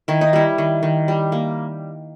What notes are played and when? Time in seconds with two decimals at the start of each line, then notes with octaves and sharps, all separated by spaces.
0.08 D#3 E4
0.21 D#4
0.33 G3 E4
0.58 D#3
0.83 D#3
1.08 G3
1.32 A#3